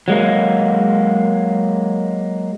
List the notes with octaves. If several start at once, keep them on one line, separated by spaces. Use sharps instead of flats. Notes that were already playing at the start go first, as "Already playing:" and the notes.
F#3 G#3 A#3